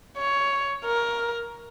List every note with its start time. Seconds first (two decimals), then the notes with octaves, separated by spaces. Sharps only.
0.18 C#5
0.85 A#4